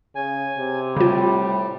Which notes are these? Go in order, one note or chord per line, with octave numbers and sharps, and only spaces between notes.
C#3 G#5
C3
A2 C#3 G3 F4